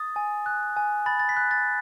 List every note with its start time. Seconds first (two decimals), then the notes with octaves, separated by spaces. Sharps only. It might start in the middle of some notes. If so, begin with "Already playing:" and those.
Already playing: D#6 A6
0.16 G#5
0.46 F#6
0.77 G#5
1.06 B5 A6
1.19 A6
1.29 B6
1.37 F#6
1.51 A6